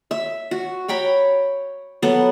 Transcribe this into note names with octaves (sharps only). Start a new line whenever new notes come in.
E5
F#4
C#5 G5 A#5 B5
F#3 B3 A4 F#5